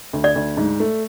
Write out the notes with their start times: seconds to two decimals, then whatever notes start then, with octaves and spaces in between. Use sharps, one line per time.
0.13 D2
0.24 D5
0.36 D2
0.57 G#2
0.80 A3